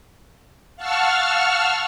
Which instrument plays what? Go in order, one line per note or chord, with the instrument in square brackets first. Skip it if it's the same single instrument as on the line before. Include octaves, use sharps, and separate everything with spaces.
[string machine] F5 F#5 A5 C#6 E6 F6